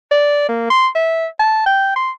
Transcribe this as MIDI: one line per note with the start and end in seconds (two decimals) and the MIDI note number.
0.11 0.49 74
0.49 0.69 58
0.70 0.87 84
0.95 1.27 76
1.40 1.64 81
1.66 1.93 79
1.96 2.11 84